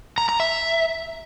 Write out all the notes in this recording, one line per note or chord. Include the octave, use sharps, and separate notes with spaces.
A#5
A#5
E5